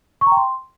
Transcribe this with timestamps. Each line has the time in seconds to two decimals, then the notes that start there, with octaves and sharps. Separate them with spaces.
0.21 C#6
0.26 A#5
0.32 G5
0.37 C6